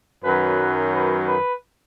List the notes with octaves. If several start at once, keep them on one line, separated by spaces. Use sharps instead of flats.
F#2 D#3 F#3 B4
B4
B4